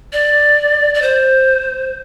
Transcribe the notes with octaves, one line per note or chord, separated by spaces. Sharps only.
D5
D5
C5